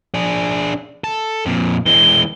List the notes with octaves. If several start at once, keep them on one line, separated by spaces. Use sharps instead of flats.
D4 G#4
A4
F2 A#2
E3 G#3 G7